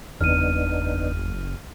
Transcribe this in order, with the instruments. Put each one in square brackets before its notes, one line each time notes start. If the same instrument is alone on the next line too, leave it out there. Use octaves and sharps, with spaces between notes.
[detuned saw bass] F#1 [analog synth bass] E2 [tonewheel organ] B3 D4 D#4 [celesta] F6 D#7